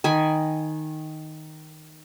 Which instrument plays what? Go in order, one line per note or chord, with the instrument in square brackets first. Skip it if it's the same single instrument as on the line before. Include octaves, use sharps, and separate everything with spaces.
[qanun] D#3 G#5 B5